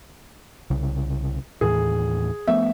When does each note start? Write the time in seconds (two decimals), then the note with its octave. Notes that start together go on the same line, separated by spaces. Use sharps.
0.70 C2 C#3
1.61 D#2 A2 E3 G#4
2.47 F3 A3 B3 E5